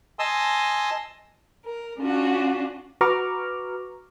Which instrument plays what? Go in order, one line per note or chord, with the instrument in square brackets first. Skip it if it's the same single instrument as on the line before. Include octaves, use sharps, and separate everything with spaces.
[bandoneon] D#5 G#5 A5 C6 D#6 E6
[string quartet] A#4
C#4 D4 F4 F#4
[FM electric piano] F#4 B4 A#5 C#6 D6 F6